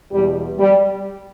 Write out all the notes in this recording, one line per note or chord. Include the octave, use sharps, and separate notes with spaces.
E2 B2 G3
G3